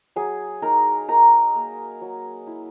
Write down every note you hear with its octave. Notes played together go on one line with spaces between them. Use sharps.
F#3 G#4 G#5
D#4 A#4 A#5
D#4 A#4 A#5
A#3
F#3
E4